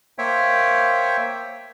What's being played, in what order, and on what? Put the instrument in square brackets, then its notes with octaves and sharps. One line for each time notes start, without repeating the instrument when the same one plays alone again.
[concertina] A#3 C5 C#5 E5 G5